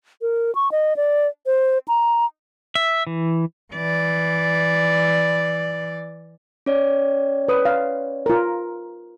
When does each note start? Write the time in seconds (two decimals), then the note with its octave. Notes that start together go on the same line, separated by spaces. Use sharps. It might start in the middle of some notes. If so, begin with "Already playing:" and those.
0.22 A#4
0.55 C#6
0.72 D#5
0.97 D5
1.46 C5
1.88 A#5
2.75 E5
3.07 E3
3.74 E3 D5
6.66 C#4 C#5 D5
7.49 B4 D#6
7.65 F5
8.26 F4 A#4